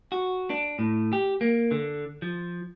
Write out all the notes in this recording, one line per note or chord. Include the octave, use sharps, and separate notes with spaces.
F#4
D4
A2
G4
A#3
D3
F3